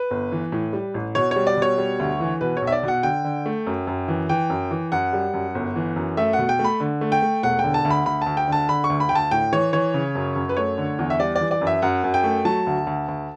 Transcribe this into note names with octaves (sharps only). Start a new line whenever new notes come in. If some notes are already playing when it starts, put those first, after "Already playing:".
Already playing: B4
G1
E3
A2
G3
A1
B2 C#5
G3 C#5
D5
B2 C#5
G3
D2
E3
B2 B4
C#5
B1
E5
D5
B2 F#5
D3 G5
D3
A3
F#2
F#2
E3
E3 G5
F#2
E3
F#2 F#5
G3
F#2
G1
E3
F#2
A3 E5
F#5
B2
G5
A3
B5
D3
A3
G5
A3
E1 F#5
D3 G5
A5
D2
B5
D2 B5
D2 A5
G5
D3 A5
D3 B5
C#6
D2
B5
D2 G5
A5
A2 G5
E3 C#5
E3 C#5
C#3
F#2
F#2
B4
A3 C#5
D3
E2
E5
G3 D5
D5
E3
D5
F#2
E5
F#2 F#5
F#2
G5
A3
F#3 A5
D2
D2
D2